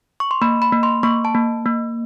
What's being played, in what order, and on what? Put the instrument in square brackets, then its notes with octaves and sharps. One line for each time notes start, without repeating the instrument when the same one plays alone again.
[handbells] C#6
C6
A#3 B5
B5
A#3
C6
A#3 C#6
A5
A#3
A#3